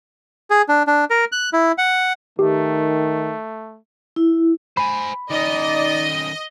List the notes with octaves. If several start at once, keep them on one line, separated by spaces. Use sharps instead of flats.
G#4
D4
D4
A#4
F#6
E4
F#5
D#3 A3 G4
E4
C5 G#5 B5
D#3 C#4 D#4 D5 D#5